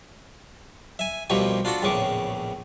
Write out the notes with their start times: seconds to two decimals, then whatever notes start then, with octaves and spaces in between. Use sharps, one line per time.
0.99 E5 G#5
1.30 C2 B2 F3 A#3 G4 C#6
1.65 D4 F4 F#4 A4 F#5
1.83 A#1 E2 A2 C#3 C#6 D6